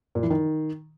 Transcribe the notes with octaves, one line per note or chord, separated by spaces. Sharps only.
A#2
E3
D#3